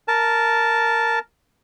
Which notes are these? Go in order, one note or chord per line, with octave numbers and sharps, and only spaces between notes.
A#4 A5